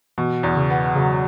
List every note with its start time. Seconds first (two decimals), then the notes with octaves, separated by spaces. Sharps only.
0.18 B2 E3
0.43 E2
0.57 C#3
0.70 B3
0.96 C#3 F#3